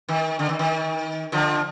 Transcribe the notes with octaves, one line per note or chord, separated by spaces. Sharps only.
D#3
D3
D#3
D#3
D3 F3